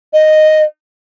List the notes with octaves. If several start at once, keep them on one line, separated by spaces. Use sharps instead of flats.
D#5